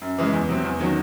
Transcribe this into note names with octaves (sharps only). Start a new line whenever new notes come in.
F#2
C#3 E3 G#3
E2
C3 F#3 C4
E2
D#3 F#3 C#4